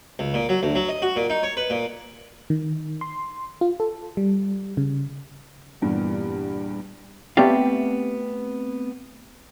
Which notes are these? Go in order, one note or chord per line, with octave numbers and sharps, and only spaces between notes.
C#2
A#2
F#3
D2
F#3
D#5
F#4
A#2
D#4
C#5
B4
A#2
D#3
C6
F4
A4
G3
C#3
E2 G2 A#2 E3 G3
A3 B3 C4 G4 D5 F5